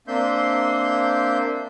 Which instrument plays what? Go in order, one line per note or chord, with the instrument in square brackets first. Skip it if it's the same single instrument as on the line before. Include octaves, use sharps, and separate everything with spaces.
[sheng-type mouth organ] A#3 C4 D4 E5 C6 G6